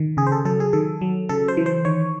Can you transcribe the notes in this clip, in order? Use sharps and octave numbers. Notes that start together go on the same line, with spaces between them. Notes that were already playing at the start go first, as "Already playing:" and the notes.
Already playing: D#3
C#3 G#4
C5
A4
F#3 A4
G#4
D#3 A4
F#3
C#3 A4
C5
E3
C5
D#3 C#5